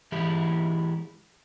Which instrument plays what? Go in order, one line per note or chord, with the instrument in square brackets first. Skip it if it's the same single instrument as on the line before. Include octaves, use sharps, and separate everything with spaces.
[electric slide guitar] E3 G#3 E4 G4